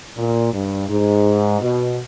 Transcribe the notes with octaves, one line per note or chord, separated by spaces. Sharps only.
A#2
G2
G#2
B2